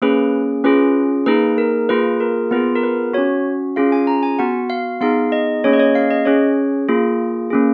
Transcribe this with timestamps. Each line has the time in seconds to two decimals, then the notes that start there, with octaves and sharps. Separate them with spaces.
0.02 A#3 C#4 G#4 B4
0.64 C#4 F4 G#4 B4
1.26 A#3 D#4 G#4 B4
1.58 A#4
1.89 A#3 F4 G#4 B4
2.20 A#4
2.51 B3 F4 G#4 B4
2.76 A#4
2.83 B4
3.13 C#4 F#4 C#5
3.76 C#4 F4 G#4 F5
3.92 G#5
4.07 A#5
4.23 G#5
4.39 B3 F#4 F#5
4.70 F5
5.01 B3 D#4 G#4 F5
5.32 D#5
5.64 A#3 C#4 G#4 C#5
5.73 D#5
5.79 C#5
5.95 F5
6.11 D#5
6.25 C#4 G#4 C#5
6.88 A#3 F4 G#4
7.50 A#3 C#4 G#4